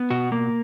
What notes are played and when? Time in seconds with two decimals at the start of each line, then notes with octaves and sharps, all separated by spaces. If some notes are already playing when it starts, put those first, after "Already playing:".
Already playing: B3
0.11 B2 F#4
0.32 A#3